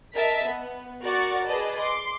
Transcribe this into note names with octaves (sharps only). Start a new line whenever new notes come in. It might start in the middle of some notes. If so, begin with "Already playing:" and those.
A#4 D#5 E5 A5 B6
B3
F#4 A#4 D5 F#5 C#6 A6
G#4 B4 D5 D#5 A5
C6 D6